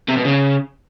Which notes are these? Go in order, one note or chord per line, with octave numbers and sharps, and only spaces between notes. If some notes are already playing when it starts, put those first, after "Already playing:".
C3
B2
C#3